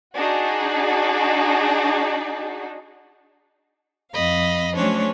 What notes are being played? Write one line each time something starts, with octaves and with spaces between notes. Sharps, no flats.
D4 D#4 F#4 G#4
F2 D#5 F5 B5
F#3 A3 C#4 D4 C5 C#5